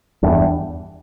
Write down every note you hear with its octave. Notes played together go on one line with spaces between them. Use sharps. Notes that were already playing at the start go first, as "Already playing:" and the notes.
E2 G2